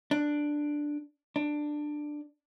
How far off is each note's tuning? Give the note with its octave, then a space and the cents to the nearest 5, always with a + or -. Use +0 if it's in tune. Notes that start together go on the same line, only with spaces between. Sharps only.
D4 +5
D4 +15